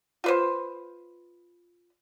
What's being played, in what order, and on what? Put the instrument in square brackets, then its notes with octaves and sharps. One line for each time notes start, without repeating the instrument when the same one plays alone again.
[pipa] F4 B4 C5